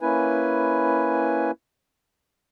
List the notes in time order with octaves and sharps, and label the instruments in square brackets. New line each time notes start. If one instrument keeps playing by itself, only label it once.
[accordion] A#3 C#4 E4 B4 G#5